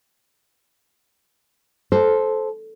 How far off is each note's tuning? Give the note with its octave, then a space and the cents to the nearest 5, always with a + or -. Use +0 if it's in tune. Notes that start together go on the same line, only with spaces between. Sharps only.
A4 -15 C5 +0